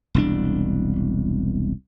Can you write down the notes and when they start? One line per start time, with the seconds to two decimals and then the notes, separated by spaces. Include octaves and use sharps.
0.15 E1 C2 D4